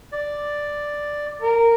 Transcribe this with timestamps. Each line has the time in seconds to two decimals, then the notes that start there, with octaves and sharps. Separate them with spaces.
0.12 D5
1.42 A#4